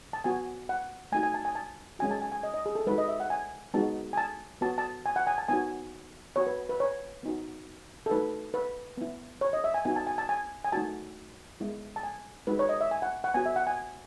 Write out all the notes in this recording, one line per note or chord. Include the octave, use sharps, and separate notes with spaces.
A5
B3 F#4 G#5
F#5
A3 D#4 F#4 G#5
G#5
A5
G#5
A5
G#3 C#4 F#4 G#5
A5
G#5
G#5
D#5
D#5
G#4
A4
G#3 D#4 F#4 B4
D#5
E5
F#5
G#5
G#3 B3 D#4 F#4 A5
G#5
A5
B3 F#4 A5
A5
G#5
F#5
G#5
A5
B3 D#4 F#4 G#5
B3 F#4 C#5
B4
B4
C#5
B3 D#4 F#4
A4
A3 D#4 F#4 B4
B4
B3 E4
C#5
D#5
E5
G#5
B3 D#4 F#4 G#5
A5
G#5
A5
G#5
G#5
A3 D#4 F#4 A5
G#3 B3 E4
A5
G#5
G#3 D#4 F#4 B4
C#5
D#5
E5
G#5
F#5
F#5
B3 F#4 G#5
E5
F#5
G#5